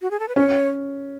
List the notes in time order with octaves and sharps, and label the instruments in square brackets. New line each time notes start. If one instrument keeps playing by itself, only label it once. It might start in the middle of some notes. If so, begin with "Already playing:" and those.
[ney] F#4
G#4
A4
B4
[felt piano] C#4 [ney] C#5